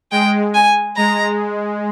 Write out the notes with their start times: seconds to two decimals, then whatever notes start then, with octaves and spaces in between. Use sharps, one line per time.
0.11 G#3 G5
0.54 G#5
0.97 G#3 A#5